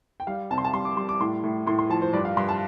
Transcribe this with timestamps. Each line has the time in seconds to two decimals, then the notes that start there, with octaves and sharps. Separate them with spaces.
0.20 G5
0.27 G3 F5
0.51 C3 A5
0.58 C6
0.64 A5
0.73 G3 C6
0.85 D6
0.96 G3 C6
1.09 D6
1.20 A2 C6
1.44 A2
1.67 A2 C6
1.79 C6
1.90 F3 A5
2.02 C5
2.13 G2 D5
2.25 F5
2.37 G2 C6
2.49 A5